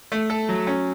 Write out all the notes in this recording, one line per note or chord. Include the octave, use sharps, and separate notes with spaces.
A3
A4
F#3
C#4